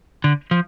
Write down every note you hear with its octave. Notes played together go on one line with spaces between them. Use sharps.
D3
F3